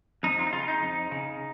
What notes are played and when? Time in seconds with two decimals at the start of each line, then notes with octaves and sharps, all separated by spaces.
0.23 F2 D#4
0.39 F4
0.47 D#4
0.52 C#3 F4
0.68 D#4
0.82 F2
1.11 C#3